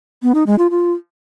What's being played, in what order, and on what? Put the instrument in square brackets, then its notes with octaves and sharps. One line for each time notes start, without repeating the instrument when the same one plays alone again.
[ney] B3
D#4
G#3
F4
F4